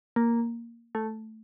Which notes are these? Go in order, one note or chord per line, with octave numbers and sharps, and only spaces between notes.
A#3
A3